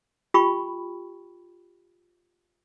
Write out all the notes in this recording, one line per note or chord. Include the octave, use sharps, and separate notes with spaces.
F4 G4 G5 B5 C#6